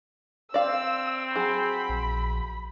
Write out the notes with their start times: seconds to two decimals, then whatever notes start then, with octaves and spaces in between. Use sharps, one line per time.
0.54 C4 D5 F5 E6
1.36 F#3 G#4 B5
1.89 A#1